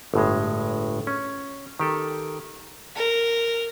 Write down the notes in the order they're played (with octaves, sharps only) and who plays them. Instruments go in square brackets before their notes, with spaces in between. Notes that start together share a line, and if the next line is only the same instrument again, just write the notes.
[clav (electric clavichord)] G1 A2 G#3
C#4
D#3 G4 A4
[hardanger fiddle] A#4